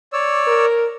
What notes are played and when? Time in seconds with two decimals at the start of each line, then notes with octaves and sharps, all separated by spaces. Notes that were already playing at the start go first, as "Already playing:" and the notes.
0.13 C#5 D5 E6
0.47 A#4